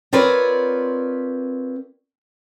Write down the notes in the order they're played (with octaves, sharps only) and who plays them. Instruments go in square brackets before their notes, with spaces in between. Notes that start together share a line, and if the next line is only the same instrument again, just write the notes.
[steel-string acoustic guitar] C4 F4 A#4 B4 C#5 D5